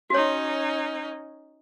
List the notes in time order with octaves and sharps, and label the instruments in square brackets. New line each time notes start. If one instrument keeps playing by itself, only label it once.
[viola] C#4 D#4 [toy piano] F#4 C#5